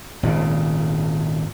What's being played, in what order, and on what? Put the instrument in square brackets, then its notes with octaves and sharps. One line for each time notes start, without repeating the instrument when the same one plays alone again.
[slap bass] G#1 A#2 C#3